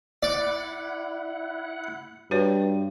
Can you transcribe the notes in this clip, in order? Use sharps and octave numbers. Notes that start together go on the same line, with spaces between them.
E4 D5 F#5
G2 F#4 B4 C#5